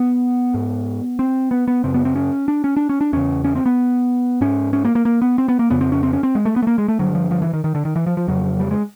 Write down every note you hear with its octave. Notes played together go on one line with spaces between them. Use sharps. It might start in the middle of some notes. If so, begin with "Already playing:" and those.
Already playing: B3
G#2
C4
B3
B3
F#2 C#3 C4
B3
C4
C#4
D4
C#4
D4
C#4
D4
E2 C#3 C#4
C#4
C4
B3
G#2 C#4
C#4
A#3
A#3
A#3
B3
C4
B3
A#3
F2 C#3 B3
C4
C#4
C4
C#4
C4
G#3
A3
B3
A3
A#3
G#3
A3
G2 D3 F#3
F3
F3
E3
D#3
D#3
D3
D#3
E3
F3
F3
F2 C#3 F#3
G3
G#3